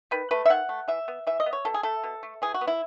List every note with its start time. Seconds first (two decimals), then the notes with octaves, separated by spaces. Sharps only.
0.11 D#3 B4
0.31 A3 B4
0.46 E5
0.50 D#3 F#5
0.69 A3
0.88 E3 E5
1.08 B3
1.27 E3 E5
1.40 D#5
1.46 B3
1.53 C#5
1.65 B2 A4
1.74 G#4
1.83 A3 A4
2.04 B2
2.23 A3
2.42 E3 G#4
2.54 F#4
2.61 B3
2.67 E4